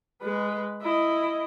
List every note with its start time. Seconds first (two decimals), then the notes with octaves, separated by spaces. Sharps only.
0.21 G#3 B4
0.82 E4 D#5